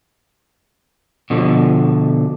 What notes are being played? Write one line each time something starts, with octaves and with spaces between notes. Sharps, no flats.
B2 D3 F3